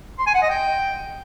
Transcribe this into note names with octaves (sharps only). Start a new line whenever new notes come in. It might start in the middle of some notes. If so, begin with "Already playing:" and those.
C6
G#5
F#5
D#5
G5